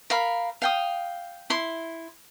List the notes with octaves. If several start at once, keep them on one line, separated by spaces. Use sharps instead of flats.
A#4 F5 B5
F5 G5 D#6
E4 C6